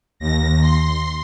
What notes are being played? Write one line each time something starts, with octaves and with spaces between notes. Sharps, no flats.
D#2 A#6
C6